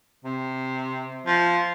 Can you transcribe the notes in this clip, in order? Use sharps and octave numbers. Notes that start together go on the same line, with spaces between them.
C3
F3